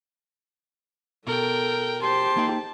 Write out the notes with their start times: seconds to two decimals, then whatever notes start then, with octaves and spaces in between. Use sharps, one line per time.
1.27 B2 A4 A#4 G5
2.02 G4 C5 A5 C6
2.37 A#3 D#4 G5